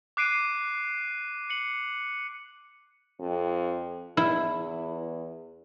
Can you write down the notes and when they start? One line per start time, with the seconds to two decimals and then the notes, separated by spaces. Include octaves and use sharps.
0.17 D6 F#6 C7 D7 D#7
1.50 C#7 F#7
3.20 F2
4.17 E2 E4